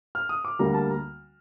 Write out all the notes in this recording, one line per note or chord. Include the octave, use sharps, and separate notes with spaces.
F6
D#6
D6
D2 D3 G3 A#3 A#5
A5
A#5